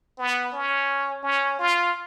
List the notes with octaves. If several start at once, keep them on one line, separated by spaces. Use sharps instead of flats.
B3
C#4
C#4
F4